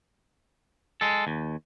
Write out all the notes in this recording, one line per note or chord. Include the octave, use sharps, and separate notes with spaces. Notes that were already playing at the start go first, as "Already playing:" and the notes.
G#3 A4
D#2